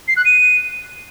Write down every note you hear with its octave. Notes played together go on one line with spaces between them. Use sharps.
C7
F#6
D#7